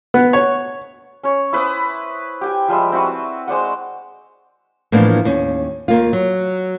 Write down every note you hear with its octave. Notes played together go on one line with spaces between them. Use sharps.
B3
C#5
C#4 C#5
E4 B4 C5 D#6
G4 G5 G#5
F3 G3 G#3 E5
C4 E4 F#4 B4
G#3 C5 D5 F#5
A2 E3 F3 A#3 B3 D4
D#2 C#4
D#2 A#3 F4
F#3